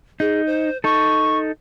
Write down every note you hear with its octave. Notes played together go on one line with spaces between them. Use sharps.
D#4 G#4
C5
D#4 A4 C#6